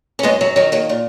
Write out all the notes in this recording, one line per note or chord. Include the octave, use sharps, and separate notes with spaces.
C#4
F#2 G#3 B3
F#3
D#3 F#3
F#3 A#3
A#2